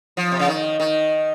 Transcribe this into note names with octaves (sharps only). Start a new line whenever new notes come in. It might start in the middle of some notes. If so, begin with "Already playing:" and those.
F3
C3
C#3
D#3
D#3